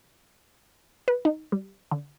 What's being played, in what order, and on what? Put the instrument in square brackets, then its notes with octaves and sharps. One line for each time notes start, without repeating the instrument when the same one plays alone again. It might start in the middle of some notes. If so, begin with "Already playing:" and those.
[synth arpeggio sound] B4
D#4
G3
D3